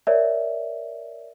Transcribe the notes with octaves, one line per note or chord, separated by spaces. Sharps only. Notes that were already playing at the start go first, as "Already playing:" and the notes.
A#4 C#5 D5 E5